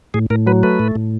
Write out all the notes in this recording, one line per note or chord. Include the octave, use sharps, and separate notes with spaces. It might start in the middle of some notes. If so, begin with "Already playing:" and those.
A2 G#4
A2 A#4
F#3 B4
A3 B4
A2
A2